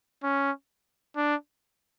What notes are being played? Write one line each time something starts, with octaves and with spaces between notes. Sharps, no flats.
C#4
D4